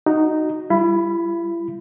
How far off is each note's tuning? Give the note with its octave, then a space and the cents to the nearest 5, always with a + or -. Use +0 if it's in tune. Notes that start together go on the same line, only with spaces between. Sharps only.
D#4 -5 F#4 +0
G3 +0 E4 +40 B5 +5